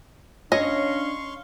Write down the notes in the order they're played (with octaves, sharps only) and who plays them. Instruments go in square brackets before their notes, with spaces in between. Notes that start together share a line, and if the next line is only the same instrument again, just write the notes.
[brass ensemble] C#4 D4 [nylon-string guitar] C#5 [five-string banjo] D#5 [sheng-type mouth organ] F5 C6 C#6